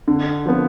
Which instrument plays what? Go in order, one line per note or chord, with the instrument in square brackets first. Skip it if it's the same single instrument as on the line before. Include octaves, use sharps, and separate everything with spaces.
[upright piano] D3
F3 B3